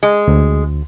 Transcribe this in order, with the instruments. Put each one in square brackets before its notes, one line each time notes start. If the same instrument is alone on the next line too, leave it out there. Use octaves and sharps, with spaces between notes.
[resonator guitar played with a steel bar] G#3
[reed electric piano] D2